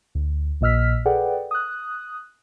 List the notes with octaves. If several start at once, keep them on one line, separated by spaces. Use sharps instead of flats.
D2
A#1 A#2 D#5 E6 F6 B6
G#4 A4 B4 D5 F#5 G5
D#6 F#6